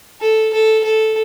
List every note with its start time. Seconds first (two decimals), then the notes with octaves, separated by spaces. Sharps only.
0.21 A4
0.54 A4
0.84 A4